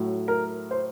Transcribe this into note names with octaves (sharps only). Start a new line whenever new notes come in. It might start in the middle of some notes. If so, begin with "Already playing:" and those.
Already playing: A2 F#3
A#4
C5